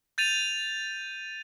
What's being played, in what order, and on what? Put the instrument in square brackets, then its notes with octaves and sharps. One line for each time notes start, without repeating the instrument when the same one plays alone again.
[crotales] G6 A6 D#7 F7